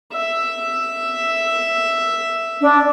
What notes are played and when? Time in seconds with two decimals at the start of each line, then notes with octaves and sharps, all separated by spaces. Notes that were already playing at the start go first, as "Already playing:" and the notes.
0.13 E5
2.61 D4